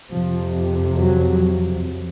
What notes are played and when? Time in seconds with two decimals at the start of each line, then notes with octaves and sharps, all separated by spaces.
0.11 F2 C3 F3
0.96 F#3
1.81 F2